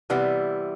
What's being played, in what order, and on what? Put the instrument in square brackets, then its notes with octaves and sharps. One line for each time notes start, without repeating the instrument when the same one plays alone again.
[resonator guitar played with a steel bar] C3 E3 G3 B3